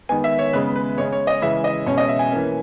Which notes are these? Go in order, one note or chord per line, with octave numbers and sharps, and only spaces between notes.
D#3 G#3 B3 G#5
E5
C#5
C#3 G#3 B3 B4
B4
C#3 G#3 C#4 C#5
C#5
D#5
C#3 E3 G#3 C#4 E5
D#5
B2 G#3 C#4 C#5
D#5
E5
G#5
E3 A#3 C#4